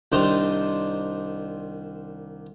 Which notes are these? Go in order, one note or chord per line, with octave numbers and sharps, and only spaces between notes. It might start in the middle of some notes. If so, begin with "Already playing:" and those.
C2 D#3 D4 C5 D#5 A#5